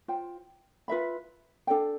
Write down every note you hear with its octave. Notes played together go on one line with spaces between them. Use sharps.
F4 C5 G5
F4 B4 E5 B5
D4 A4 D5 G5